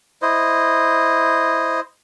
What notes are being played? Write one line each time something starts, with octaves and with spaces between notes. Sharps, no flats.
E4 C5 D#5